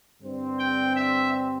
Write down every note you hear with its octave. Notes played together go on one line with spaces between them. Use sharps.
G2 D3 G3 C4
G5
E5